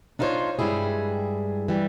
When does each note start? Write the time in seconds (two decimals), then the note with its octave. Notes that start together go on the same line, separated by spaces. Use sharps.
0.19 D4 D#4 F4 A4 C5 C#5
0.59 G2 G3 G#3 E4 G#4
1.68 E3 G3